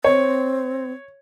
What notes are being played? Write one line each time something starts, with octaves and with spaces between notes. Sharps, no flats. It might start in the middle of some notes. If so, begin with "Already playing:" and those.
C4 C#5